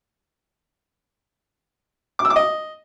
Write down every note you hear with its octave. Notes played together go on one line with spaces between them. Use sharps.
D6
E6
D6
D#5